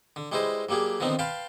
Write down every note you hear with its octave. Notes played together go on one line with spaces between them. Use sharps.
D3
G3 G#3 E4 B4 C5 D#5
F#3 G3 A#3 G4 G#4
D3 D#3 F3 B3 C4 D#4
B4 F5 G5 A5 B5 C6